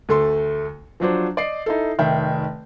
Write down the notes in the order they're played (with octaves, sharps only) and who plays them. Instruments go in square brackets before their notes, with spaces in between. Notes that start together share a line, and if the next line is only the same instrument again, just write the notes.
[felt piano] D2 A3 A4 C6
F3 F#3 D4 C5
D5 D#5 C7
D#4 E4 A4
F1 D#3 E5 G5